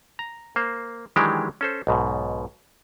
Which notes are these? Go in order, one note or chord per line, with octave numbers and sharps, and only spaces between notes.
A#5
A#3 C5
D#3 E3 F#3 G#3 D4 G4
C#4 A4 C5
B1 G#2 B2